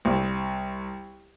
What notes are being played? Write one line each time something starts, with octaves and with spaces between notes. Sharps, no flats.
C2